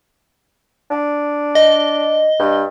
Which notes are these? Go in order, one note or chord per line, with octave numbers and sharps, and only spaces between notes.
D4
D#5
G2